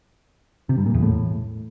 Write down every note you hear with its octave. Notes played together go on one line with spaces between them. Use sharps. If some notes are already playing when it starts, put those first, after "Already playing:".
C3
G2
A#2
E2
A2